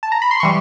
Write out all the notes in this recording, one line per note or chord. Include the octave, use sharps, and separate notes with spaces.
A5
A#5
B5
C6
E3 G3 C#6